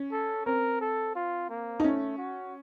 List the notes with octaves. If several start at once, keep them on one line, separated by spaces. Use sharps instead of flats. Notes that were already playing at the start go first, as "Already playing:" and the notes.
Already playing: C#4
A4
C4 A#4
A4
F4
A#3
D#4
A3 C#4
F#4